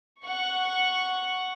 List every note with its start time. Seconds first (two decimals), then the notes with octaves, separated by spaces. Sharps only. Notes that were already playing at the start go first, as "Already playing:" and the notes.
0.22 F#5 C#6